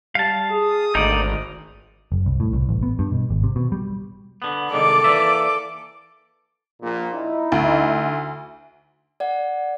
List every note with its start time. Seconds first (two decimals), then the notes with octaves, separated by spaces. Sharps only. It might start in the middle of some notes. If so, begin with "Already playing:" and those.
0.15 G3 F5 A5
0.51 G#4 D#6
0.95 G#1 D2 D#4 D5
2.12 F#1
2.26 C2
2.40 A2
2.53 C2
2.69 A1
2.83 B3
2.99 G2
3.12 B2
3.30 G#1
3.44 C3
3.56 B2
3.72 G3
4.42 D3 B3
4.72 C2 D#3 G#3 A4 D5 D6
5.04 E3 A#3 E5
6.82 A#1 A#2
7.14 D#4 E4
7.52 D2
9.20 D5 F#5